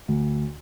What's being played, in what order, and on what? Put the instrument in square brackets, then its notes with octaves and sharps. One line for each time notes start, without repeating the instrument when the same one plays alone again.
[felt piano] D2